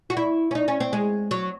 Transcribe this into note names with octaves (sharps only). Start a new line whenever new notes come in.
F#4
E4
C#4
D#4
C#4
C4
G#3
F#3